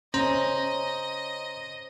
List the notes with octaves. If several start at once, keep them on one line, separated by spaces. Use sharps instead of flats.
C#4 C5 D#5 A#5